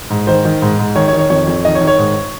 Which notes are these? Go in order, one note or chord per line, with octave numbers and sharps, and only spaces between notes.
G#2
D#3 C5
D#3
G#2
G#2
D#3 C#5
C#5
D#3
C#5
F2 C#5
F2
D#3 D#5
C#5
D#3
C#5
G#2